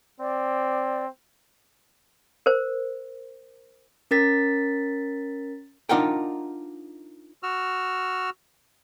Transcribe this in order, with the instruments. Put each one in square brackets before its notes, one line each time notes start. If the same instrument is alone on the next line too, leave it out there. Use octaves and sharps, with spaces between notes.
[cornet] C4 [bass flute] D5
[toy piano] A#4 C5
[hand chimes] C#4 A#4 A6 B6
[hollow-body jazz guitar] D4 D#4 F4 A#4 F#5 G5
[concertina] F#4 E6 F6